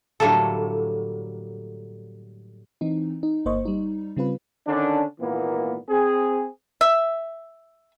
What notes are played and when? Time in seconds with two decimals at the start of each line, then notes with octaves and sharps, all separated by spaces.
0.20 A2 D3 F#3 G3 A#3 A4
2.81 E3 C4 D#4
3.23 D#4
3.45 G1 A#3 C5 D#5 C#6
3.65 G3 D#4
4.16 C#3 G3 C4 F4 B4
4.67 D3 D#3 C#4 D4
5.20 G#1 A#2 E3 A#3 B3
5.89 C4 G#4
6.81 E5